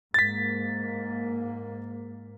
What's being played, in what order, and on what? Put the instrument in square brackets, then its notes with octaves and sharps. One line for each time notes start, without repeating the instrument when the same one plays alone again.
[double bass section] G#2 A#3 [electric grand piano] A6 B6